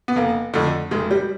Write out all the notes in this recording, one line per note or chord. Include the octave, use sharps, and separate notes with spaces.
B3
F1 A#3
F2 D3 A3
F1 G#3
G3